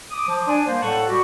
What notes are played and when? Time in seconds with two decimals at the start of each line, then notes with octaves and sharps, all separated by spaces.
0.11 D6 D#6
0.27 F3
0.47 D4 D5 G#5
0.66 G3 A#3 A#4 C5
0.81 A2 G3 A4 F#5 A5 C#6
1.08 G3 F#4 G4